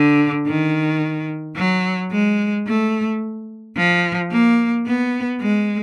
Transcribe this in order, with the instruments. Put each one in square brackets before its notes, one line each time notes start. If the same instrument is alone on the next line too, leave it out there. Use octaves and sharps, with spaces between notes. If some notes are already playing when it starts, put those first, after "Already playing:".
Already playing: [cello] D3
D#3
F#3
G#3
A3
F3
A#3
B3
G#3